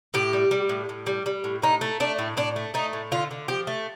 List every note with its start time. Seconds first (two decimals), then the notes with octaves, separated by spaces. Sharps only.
0.14 A2 G4
0.33 G3
0.51 G3
0.69 A2
0.89 A2
1.06 G3
1.26 G3
1.44 A2
1.62 A2 D#4
1.81 A3
2.00 A3 D4
2.19 A2
2.37 A2 D4
2.56 A3
2.74 A3 D#4
2.93 A2
3.12 D3 F4
3.31 D3
3.48 F3 G4
3.67 A3